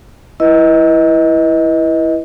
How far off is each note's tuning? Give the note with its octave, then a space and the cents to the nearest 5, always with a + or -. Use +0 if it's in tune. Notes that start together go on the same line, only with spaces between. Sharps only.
E4 +0 B4 -25 D#5 +20